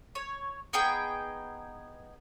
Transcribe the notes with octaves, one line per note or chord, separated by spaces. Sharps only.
C#5
B3 D#4 G#4 G5